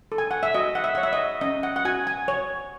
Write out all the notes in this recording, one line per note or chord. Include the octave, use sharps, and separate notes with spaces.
A4
G#5
F#5
E5
F#4 D#5
F#5
E5
C#5 F#5
E5
D#5
C#4 D#5
F#5
F#5
F#4 G#5
G#5
C#5